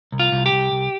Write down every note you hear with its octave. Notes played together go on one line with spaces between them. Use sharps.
C2
F4
C2
G4
C2
C2